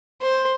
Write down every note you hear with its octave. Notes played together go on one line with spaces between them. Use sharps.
C5